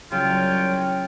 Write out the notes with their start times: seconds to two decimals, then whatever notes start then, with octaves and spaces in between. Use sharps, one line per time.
0.12 C2 C#3 F#3 F4 C#5 G5